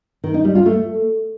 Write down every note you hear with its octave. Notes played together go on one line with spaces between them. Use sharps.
D#3
D#4
G3
F4
A3